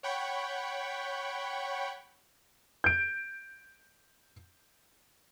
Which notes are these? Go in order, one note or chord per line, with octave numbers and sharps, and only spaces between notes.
C#5 F#5 G5 B5 C#6
G6 D7